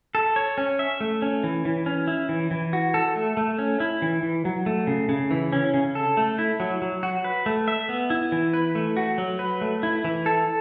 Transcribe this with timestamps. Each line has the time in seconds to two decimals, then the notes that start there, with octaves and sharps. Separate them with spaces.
0.15 A4
0.36 C#5
0.58 C#4
0.79 E5
1.01 A3
1.22 C#4
1.44 E3
1.65 E3
1.86 C#4
2.08 E4
2.29 E3
2.51 E3
2.73 F#4
2.94 A4
3.16 A3
3.37 A3
3.58 C#4
3.80 E4
4.02 E3
4.23 E3
4.45 F#3
4.66 A3
4.87 C#3
5.09 C#3
5.31 E3
5.52 C#4
5.74 C#3
5.95 A4
6.17 A3
6.38 E4
6.60 F#3
6.82 F#3
7.03 F#4
7.24 B4
7.46 A3
7.68 E5
7.89 B3
8.10 E4
8.32 E3
8.54 B4
8.75 A3
8.97 F#4
9.18 F#3
9.39 B4
9.61 A3
9.83 E4
10.04 E3
10.26 A4